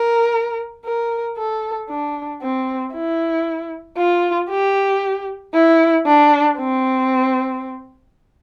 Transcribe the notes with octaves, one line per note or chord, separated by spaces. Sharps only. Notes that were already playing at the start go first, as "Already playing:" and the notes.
Already playing: A#4
A#4
A4
D4
C4
E4
F4
G4
E4
D4
C4